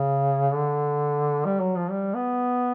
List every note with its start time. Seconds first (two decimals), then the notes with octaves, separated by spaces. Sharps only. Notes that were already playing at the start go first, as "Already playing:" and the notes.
Already playing: C#3
0.53 D3
1.45 G3
1.60 F#3
1.76 F3
1.91 G3
2.14 B3